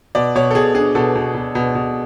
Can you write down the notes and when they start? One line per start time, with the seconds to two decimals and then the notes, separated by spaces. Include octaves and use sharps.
0.15 B2 D5
0.35 B2 C#5
0.51 A4
0.55 B2 G#4
0.74 D4 G#4
0.95 B2 A4
1.15 B2
1.34 B2
1.55 B2
1.75 B2